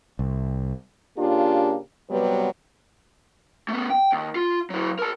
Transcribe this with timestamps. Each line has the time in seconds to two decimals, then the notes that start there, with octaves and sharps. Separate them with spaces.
0.19 C2
1.17 C#3 A#3 D4 F4 G4
2.10 C3 F#3 G3 B3 B4
3.68 A3 B3
3.90 G5
4.12 D#2
4.35 F4
4.70 F#3 E4
4.99 A#4 A5